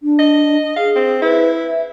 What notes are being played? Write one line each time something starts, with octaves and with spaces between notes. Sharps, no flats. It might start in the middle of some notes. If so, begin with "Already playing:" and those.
D4
D#5
G#4 F5
C4
E4 B4
E5